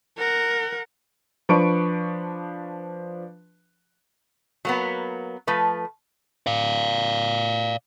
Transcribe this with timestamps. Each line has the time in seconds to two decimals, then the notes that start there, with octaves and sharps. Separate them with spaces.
0.18 A#4 F#5
1.49 F3 D4 B4 C#6 D7
4.65 F#3 A#3 B3
5.47 F3 A3 B4
6.47 D5 F5